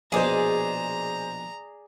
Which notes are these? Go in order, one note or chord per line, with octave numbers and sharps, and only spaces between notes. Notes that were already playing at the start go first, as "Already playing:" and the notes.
A#1 B2 G#4 C5 D5 D#5 G#5 A#5